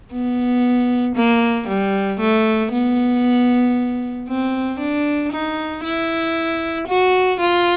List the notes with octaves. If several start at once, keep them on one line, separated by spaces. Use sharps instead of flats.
B3
A#3
G3
A3
B3
C4
D4
D#4
E4
F#4
F4